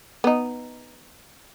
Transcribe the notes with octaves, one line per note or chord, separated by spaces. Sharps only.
B3 D#4